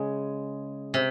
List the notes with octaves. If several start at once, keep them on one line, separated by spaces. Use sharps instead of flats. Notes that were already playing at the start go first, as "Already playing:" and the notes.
Already playing: C#3 G#3
C3